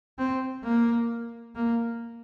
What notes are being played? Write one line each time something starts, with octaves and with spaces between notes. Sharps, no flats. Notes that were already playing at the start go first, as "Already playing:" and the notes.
C4
A#3
A#3